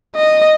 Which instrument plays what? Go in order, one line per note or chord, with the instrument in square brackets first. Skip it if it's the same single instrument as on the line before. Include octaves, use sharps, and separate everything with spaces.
[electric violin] D#5